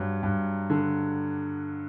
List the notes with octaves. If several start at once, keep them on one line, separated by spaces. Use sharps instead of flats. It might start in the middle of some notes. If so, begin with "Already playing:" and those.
Already playing: G2 F#3
G2
D3